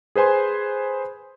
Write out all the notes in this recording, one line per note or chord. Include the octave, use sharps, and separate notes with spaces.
G#4 B4 C5 G#5 C6